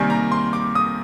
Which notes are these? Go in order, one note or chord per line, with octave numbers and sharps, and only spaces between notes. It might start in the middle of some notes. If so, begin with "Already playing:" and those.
Already playing: C3 D#3 G3 A#3 G#5
A#5
C6
D6
D#6